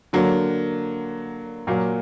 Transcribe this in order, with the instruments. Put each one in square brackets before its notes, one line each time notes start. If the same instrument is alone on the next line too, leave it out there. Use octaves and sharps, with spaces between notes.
[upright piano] D3 F#3 A#3
A#2 F#3 A#3